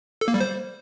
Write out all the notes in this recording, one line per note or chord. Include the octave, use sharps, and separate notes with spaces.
A4
A#3
G3
C5